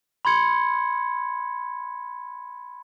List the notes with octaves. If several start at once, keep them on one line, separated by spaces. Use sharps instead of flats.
B5 C6 G#6 C#7